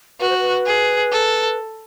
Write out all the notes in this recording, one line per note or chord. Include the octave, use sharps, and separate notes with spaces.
F#4 B4
C5
B4
G#4
A4